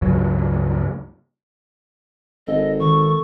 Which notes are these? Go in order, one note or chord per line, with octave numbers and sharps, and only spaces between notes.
C#2 G2 F#3
G#1 A4 D#5
D#3 C#6